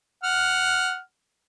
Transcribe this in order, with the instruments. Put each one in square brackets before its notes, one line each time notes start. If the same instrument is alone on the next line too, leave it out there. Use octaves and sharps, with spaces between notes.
[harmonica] F#5 F6